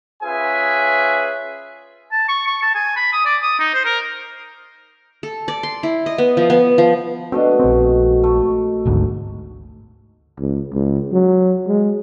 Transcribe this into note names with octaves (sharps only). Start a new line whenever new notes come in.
C#4 F4 G#4 B4 E5 G#5
A5
C#6
C#6
A5
G#5
B5
D#6
D5
D#6
D#4
C5
A#4
A4
D5
C6
E4
D#5
B3
F3
B3
F3
B2 A3 C4 D4 D#5
A#1 C4
A3
G#1 D2 G#2
C#2
C#2
F#3
G#3